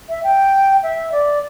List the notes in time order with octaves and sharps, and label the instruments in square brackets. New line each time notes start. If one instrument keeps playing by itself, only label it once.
[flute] E5
G5
E5
D5